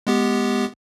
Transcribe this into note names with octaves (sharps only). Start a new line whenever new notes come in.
G#3 B3 G4